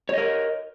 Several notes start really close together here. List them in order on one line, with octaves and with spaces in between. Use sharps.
C#5 D#5 A#4